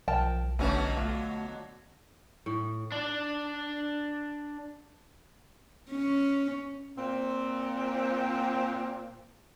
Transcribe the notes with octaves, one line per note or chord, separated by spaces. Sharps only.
B1 F3 A#4 G5 A5
G1 B2 D3 F#3 A3 C#4 B4
A3 F4
A2
D4 D5
C#4
A#2 C4